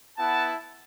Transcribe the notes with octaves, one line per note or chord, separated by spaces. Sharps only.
B3 E4 F#5 A5